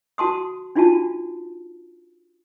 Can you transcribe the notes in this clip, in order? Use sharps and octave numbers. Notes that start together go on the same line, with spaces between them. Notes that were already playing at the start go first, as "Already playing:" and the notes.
F#4 A5 C6 D#6
D4 D#4 F4 F#4 A5